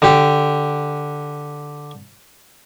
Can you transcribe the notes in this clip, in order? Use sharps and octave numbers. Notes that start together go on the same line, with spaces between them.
D3 G4